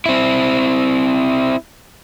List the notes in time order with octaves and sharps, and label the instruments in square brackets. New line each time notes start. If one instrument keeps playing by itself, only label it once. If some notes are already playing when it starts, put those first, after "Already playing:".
[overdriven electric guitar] C4 E4